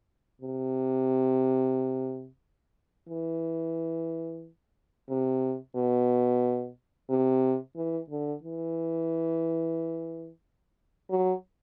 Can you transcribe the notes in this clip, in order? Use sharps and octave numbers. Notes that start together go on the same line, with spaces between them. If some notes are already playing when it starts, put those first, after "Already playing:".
C3
E3
C3
B2
C3
E3
D3
E3
F#3